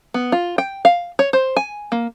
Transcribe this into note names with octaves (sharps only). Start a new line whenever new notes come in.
B3
F4
G5
F5
C#5
C5
G#5
A#3